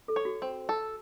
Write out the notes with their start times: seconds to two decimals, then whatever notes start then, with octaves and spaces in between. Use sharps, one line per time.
0.08 A4
0.16 C#5
0.25 F#4
0.42 C4
0.69 A4